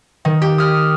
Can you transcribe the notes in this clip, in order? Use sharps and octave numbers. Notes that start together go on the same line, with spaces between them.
D#3
G4
D#6 F6